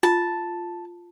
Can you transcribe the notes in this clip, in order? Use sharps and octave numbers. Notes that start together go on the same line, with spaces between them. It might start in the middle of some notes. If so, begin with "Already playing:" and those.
F4 A5